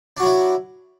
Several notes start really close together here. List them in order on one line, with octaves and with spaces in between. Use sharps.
D4 F#4 F#3 E4